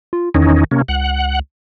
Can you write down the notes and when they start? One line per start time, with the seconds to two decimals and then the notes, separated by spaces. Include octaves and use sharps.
0.13 F4
0.34 E2 D#3 C#4 D#4
0.71 C3 A#3 C#4
0.88 C#2 F#5